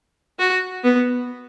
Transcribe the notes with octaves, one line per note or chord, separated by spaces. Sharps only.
F#4
B3